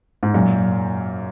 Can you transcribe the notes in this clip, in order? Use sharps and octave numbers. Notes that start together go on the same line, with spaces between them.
G#2
F#2 A#2